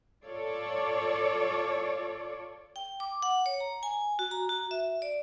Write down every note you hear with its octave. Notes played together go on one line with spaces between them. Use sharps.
F4 A4 C#5 D5
G5
D6
F#5
C#5
A#5
G#5
F#4
A#5
F#4
E5
D5